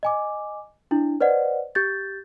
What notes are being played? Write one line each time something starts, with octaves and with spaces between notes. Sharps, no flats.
D#5 G#5 D6
D4 E4
B4 C5 D5 D#5 F#5
G4 G6 A6